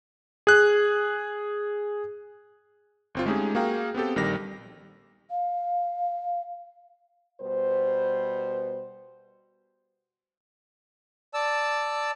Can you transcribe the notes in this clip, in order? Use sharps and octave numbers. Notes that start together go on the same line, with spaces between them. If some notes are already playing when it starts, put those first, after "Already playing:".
G#4 F#6
G1 C4 F4
G#3 A3 C#4 D#4 G4 G#4
A#3 F#4 G#4 F5 G5 A#5
B3 C4 G4 A4
A#1 D#3 G3 G4 A#6
F5
B2 G3 B4 C5
D5 A5 E6